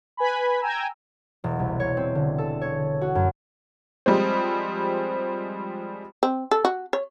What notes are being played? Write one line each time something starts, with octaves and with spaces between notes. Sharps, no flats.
B4 G#5 B5
G5 G#5 A#5 E6
E1
C2
C#5
C4
D3
A4
C#5
F#4
F#2
F3 G3 G#3 C4
C4
A4
F#4
C#5